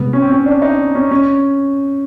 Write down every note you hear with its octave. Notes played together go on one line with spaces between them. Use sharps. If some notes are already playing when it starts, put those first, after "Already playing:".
Already playing: C3 G#3 B3
C#4
C4
C#4
D4
D#4
C#4
C#4